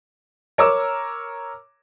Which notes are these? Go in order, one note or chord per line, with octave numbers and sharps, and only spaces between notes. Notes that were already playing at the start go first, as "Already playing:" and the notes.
A#4 C#5 A#5 D6 E6